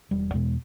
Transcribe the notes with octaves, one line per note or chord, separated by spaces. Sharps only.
E1 G3
E2 B2 G#3